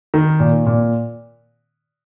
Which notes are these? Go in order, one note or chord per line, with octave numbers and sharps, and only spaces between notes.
D#3
A#2
A#2